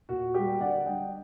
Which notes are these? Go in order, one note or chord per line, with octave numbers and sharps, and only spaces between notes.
A#2 F#4
G3 A#3 G4
D3 D5 F#5
G3 D4 D#5 G5